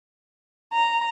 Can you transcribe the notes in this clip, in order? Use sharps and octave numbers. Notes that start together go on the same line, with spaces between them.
A#5